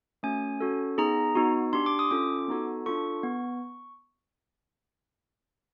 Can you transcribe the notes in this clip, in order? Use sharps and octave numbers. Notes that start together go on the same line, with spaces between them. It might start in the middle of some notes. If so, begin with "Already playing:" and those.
A3 C#4 F#4 G#5
C#4 F#4 A4
B3 D#4 G#4 A#5
B3 D#4 F#4
D4 G4 C6
D6
D#6
C#4 F4 A4 D6
B3 D#4 F#4 A4
D4 F4 A4 C#6
B3